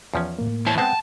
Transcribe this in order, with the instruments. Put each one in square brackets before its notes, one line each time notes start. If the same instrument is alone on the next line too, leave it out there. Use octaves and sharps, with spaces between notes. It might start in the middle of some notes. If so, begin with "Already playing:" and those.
[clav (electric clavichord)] E2 F3 C#4
[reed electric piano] A2 A#3
[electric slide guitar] E2 A5 [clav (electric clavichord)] E4 C5 C#5
[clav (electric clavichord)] G#3 B3 C4 [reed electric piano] F#5 G5 [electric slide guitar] A5